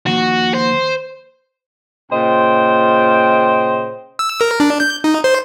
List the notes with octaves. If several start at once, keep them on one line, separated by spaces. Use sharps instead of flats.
D#2 D#3 F3 F#4
C5
A#2 C#3 C5 D#5 G5
E6
A#4
D4
G6
D#4
C5